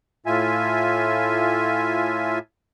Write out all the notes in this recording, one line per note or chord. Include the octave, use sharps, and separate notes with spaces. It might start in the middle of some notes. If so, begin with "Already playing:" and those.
A2 F4 E5 G#5